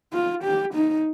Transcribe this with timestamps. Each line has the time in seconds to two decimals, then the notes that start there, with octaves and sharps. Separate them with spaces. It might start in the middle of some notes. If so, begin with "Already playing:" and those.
0.13 F4
0.44 G4
0.74 D#4